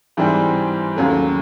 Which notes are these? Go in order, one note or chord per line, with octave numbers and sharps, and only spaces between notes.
G#2 E3 G3 C4
D#2 C#3 F#3 A3